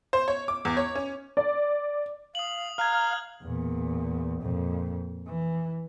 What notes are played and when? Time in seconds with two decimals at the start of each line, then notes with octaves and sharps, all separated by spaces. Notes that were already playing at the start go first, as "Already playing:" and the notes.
0.13 C5
0.28 C#5
0.48 D6
0.65 E2
0.77 C#5
0.95 C#4
1.37 D5
2.35 F5 D#6 F#7
2.78 F5 A#5 F6 F#6 G#6
3.42 E2 A#2
4.42 F2 A#2
5.27 E3